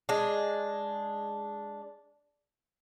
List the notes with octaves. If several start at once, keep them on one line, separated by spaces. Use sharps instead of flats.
G#3 D4